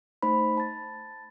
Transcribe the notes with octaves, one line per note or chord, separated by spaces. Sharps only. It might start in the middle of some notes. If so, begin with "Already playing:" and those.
A3 D#4 C5 B5
A5 A6